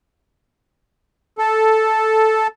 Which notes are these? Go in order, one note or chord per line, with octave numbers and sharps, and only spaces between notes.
A4